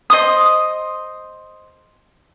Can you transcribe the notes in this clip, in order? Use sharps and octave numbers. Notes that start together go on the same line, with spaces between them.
C5 D#5 C6 D#6